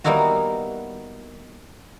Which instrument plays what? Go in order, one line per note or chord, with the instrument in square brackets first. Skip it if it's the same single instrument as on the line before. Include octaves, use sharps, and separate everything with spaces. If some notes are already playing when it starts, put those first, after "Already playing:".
[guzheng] G3 A#3 B3 D#4 E4 F#4